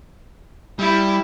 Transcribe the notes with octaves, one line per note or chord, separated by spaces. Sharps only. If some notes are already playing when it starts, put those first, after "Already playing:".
G3 E4